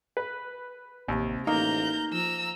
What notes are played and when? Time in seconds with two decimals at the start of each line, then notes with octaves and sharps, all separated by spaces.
0.17 B4
1.08 A1 D#2 C3
1.47 A1 A#3 D#4 A#5 G6
2.13 F3 A#5 E6